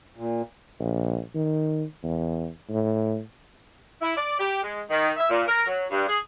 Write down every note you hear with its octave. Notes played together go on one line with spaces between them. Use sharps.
A#2
A#1
D#3
E2
A2
E4
D5
G4
G#3
D#3
E5
A#2
A#4
F#3
G2
G#4